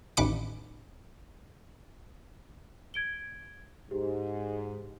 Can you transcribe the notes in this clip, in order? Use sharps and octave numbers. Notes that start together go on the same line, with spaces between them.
A1 D#2 B4 D6 C#7
G#6 D7 G7
G#2 G4